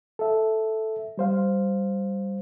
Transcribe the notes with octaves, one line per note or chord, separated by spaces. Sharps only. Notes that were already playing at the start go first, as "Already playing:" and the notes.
A4 E5
G3 C5 F5